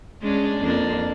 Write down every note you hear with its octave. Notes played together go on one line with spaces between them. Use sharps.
G#3 C#4 D4
F2 A#3 D4